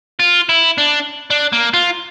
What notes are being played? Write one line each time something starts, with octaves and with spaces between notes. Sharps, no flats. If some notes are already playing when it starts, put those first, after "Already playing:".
F4
E4
D4
D4
A#3
F4